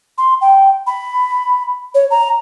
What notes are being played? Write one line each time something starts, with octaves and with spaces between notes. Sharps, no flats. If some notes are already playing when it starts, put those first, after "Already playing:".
C6
G5
B5
C#5
A#5